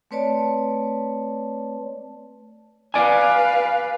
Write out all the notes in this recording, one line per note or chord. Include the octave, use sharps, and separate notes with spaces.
A3 C4 B4 C#5 D5 A5
B4 D5 F5 G#5